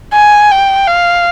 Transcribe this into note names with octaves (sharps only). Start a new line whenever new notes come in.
G#5
G5
F5